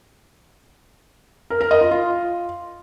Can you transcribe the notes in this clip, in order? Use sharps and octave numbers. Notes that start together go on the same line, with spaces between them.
A#4
A#4
D#5
F4
F4